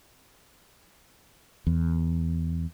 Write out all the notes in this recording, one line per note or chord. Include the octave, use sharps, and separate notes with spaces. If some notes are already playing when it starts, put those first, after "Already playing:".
E2